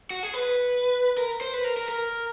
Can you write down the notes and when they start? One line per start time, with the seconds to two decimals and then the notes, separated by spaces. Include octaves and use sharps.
0.10 F#4
0.23 G#4
0.34 B4
1.17 A#4
1.41 C5
1.53 B4
1.64 A#4
1.77 A#4
1.88 A#4